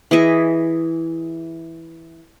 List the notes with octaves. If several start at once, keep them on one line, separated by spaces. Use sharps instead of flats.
E3 G#4 D#5 E5